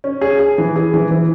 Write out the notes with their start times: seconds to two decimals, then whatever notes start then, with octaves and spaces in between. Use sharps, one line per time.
0.04 C#4
0.21 G#4
0.39 G#4
0.58 E3
0.76 G#4
0.93 E3
1.11 E3